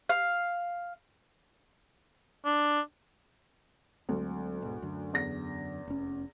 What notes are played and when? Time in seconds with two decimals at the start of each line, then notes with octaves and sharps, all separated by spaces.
0.09 F5
2.45 D4
4.09 D2 F#3 G#3 C4
4.62 G#2 B2
4.82 F#2 D3
5.13 E2 A#6
5.87 F1 C#4